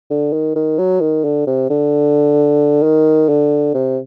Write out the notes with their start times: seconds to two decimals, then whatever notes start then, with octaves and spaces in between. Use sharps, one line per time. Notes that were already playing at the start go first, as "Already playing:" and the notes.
0.10 D3
0.33 D#3
0.56 D#3
0.79 F#3
1.01 D#3
1.24 D3
1.47 C3
1.69 D3
2.83 D#3
3.29 D3
3.74 C3